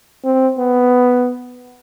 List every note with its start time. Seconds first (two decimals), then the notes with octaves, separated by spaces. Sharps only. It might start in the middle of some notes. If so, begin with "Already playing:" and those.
0.25 C4
0.59 B3